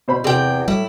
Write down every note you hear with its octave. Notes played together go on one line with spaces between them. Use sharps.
B2 C5 B5
E2 C3 G#4 G5
A2 G3 E4